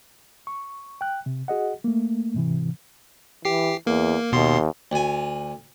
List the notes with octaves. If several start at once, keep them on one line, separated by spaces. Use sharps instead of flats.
C#6
G5 F#6
C3
F#4 G#4 D#5 F#5
A3 A#3
G#2 C3 E3
E3 G4 C7
E2 A#3
D#2 B2 C6
D2 G#5